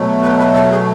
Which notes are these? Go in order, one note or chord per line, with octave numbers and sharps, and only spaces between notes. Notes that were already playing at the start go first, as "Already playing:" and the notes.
Already playing: B2 F#3 A3
B4
B4
A4
G#4